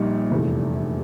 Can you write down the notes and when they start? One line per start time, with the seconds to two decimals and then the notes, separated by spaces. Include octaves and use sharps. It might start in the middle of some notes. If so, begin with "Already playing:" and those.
Already playing: A#1 A#2 G3 A#3 D#4
0.31 F1 E2 C3